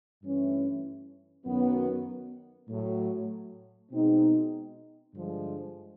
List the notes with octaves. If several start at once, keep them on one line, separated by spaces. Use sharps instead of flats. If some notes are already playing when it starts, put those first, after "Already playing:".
G2 E3 A3 C#4 E4
F#2 D#3 F#3 B3
A2 F#3 A3
B2 G#3 C4 D#4
G2 D3 F3 G#3